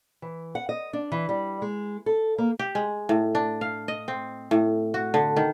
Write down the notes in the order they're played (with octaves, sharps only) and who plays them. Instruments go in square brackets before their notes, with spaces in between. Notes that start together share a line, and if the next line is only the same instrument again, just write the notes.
[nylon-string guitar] E3
F#5
D#5
D4
E3
G3
G#3
A4
A#3
[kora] G4
G#3
A2
D4
F5
D#5
C4
A2
F#4
D3
D#3